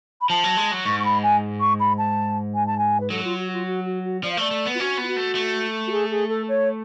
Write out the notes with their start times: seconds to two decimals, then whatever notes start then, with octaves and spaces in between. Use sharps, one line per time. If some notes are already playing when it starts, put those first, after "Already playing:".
0.21 B5
0.29 F3 A5
0.44 F#3
0.57 G#3
0.72 F#3
0.85 G#2 C#6
0.99 C#6
1.05 B5
1.23 G#5
1.60 C#6
1.80 B5
1.98 A5
2.54 G#5
2.66 A5
2.78 G#5
3.00 B4
3.10 F#3 A4
3.24 F4
3.38 F#4
3.53 F4
3.67 F#4
3.85 F#4
4.04 F#4
4.23 F3 D5
4.31 F5
4.37 A3 D5
4.51 A3
4.66 B3
4.74 F4
4.80 C#4 F#4
4.98 B3
5.03 F4
5.07 F#4
5.17 A3
5.35 A3
5.87 F#4
5.91 G#4
6.11 G#4
6.29 A4
6.48 C#5